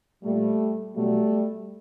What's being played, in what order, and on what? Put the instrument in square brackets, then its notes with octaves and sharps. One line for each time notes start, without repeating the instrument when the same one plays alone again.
[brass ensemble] A#2 F3 G3 A3
B2 F#3 G3 A3